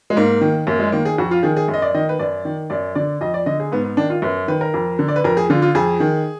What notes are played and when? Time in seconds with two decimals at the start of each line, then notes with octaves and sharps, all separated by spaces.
0.10 G#3
0.17 G#2 A#3
0.41 D#3
0.67 F#2 A#3
0.79 G#3
0.92 D#3 A#3
1.05 G#4
1.18 F2 F#4
1.31 F4
1.43 D#3 G#4
1.56 G#4
1.68 F#2
1.74 D#5
1.82 D5
1.94 D#3 D#5
2.09 B4
2.19 F#2 D5
2.45 D#3
2.70 F#2 D5
2.95 D3 D5
3.21 F2 D#5
3.34 D5
3.46 D3 D#5
3.60 G#4
3.72 G#2 B3
3.84 B3
3.97 D#3 D4
4.10 F4
4.22 F#2 B4
4.48 D#3 B4
4.61 A#4
4.74 F2
4.99 D3
5.08 D5
5.16 B4
5.24 F2 A#4
5.37 G#4
5.50 D3 F4
5.62 F4
5.75 F2 G#4
6.00 D#3